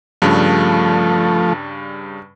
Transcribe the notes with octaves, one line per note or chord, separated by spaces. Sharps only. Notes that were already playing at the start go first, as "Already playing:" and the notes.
G2 C#3 F3 G3 A3